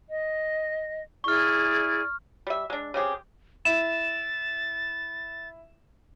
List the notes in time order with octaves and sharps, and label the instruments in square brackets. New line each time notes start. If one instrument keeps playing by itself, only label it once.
[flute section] D#5
[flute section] E4 G#4 D5 [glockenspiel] C#6 F6
[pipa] G3 E5
G#3 D4
C#3 C4 G4 G#4
[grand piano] E4 [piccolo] A6 [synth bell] E7